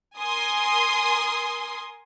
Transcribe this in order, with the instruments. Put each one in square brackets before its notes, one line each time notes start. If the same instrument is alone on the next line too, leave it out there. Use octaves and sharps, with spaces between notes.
[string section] A#4 G#5 C6 D#6